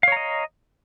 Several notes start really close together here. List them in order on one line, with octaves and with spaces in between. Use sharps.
F5 C#5 A#5 D#5